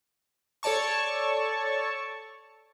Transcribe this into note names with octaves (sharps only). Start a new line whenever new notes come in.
A4 C#5 D5 A5 C#6